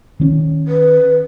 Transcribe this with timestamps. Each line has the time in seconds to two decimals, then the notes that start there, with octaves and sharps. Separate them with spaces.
0.20 D#3 C4 C#4
0.68 B4